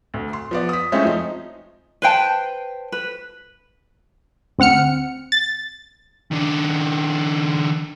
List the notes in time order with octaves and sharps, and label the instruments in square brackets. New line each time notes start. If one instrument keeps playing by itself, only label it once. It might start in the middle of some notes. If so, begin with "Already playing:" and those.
[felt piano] D2
C6
F3 B3 D5
D#6 B6
G#3 A3 C4 C#4 E4 F4
F3 D#4
[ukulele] B4 C5 G5 A5
B4
[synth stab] D2 C4 F#5 F6 C#7
A6
[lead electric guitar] D#3 D4